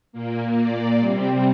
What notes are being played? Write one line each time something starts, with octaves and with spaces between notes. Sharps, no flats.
A#2 A#3
D5
C3 G3 C4